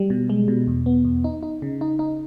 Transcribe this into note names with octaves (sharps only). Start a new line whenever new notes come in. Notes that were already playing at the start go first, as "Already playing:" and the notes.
Already playing: G3
B2
G#3
B2
E2
B3
E2
D#4
D#4
C#3
D#4
D#4